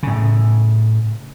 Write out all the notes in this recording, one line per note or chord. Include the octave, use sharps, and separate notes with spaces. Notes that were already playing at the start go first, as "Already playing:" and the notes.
A2 C#3